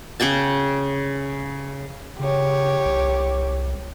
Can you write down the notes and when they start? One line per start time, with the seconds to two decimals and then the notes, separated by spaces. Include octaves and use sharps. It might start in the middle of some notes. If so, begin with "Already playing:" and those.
0.20 C#3 G#4 G5 A5
2.20 C#3 G4 C#5
2.85 C2